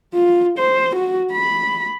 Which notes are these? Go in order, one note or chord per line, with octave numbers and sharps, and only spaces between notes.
F4
C5
F#4
B5